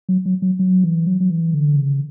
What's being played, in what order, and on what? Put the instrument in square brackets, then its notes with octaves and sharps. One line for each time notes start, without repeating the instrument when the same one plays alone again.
[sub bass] F#3
F#3
F#3
F#3
E3
F#3
F#3
E3
D3
C#3